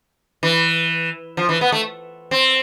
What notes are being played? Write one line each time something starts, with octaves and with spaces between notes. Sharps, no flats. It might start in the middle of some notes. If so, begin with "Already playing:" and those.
E3
F3
E3
B3
A3
C4